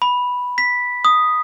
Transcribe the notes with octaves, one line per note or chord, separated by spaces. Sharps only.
B5
B6
D#6